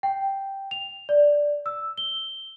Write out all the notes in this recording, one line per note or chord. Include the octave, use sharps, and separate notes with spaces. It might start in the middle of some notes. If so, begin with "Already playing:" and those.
G5
F7
D5
E6
G7